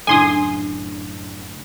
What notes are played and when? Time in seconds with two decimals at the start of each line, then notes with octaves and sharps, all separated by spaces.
0.07 F#2 A2 C#3 D4 A4 G#5 C6 D#6